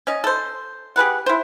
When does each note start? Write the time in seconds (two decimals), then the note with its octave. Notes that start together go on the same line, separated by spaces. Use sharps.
0.07 C#4 D#5
0.24 A4 C5
0.96 G4 G#4 B4 F#5
1.26 E4 C5